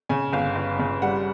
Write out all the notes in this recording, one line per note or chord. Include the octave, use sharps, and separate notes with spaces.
C#3 G#5
G1 F5
G1
C#3
G3 F#5